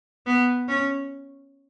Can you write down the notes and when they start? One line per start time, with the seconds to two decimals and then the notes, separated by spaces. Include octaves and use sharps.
0.27 B3
0.68 C#4